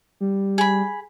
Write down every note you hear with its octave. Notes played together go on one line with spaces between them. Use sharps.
G3
G#4 B5